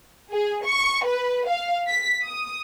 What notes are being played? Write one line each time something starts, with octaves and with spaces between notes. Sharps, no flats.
G#4
C#6
B4
F5
B6
D#6